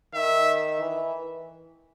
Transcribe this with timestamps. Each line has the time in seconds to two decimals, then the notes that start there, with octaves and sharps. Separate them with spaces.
0.14 D#3 E5
0.81 E3